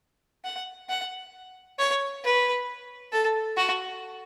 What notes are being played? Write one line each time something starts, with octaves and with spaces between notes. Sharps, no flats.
F#5
F#5
C#5
B4
A4
F#4